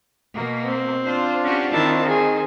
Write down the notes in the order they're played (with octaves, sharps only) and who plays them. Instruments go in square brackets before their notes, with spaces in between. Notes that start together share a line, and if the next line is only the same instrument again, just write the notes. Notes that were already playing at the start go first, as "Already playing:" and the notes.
[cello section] B2 A#3
[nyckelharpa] C4
[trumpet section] D4 F4 [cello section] C5
[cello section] C#4 F#4 G4
[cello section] D#3 C4 [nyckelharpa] E4 A5
[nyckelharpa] G#4